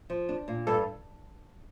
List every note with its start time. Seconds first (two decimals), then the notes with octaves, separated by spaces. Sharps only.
0.10 F3
0.29 D4
0.48 A#2
0.67 G2 A4